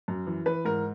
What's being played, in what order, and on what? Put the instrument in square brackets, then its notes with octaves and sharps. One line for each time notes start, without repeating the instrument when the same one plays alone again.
[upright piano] F#2
E3
E3 B4
G#2 A#4